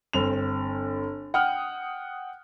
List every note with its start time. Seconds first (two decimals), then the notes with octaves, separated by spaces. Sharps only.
0.13 G1 C4 F7
1.34 F#5 G5 D#6 F6